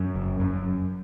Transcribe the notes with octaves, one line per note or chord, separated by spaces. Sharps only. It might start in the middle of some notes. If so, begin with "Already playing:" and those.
Already playing: F#2
F#1
F#2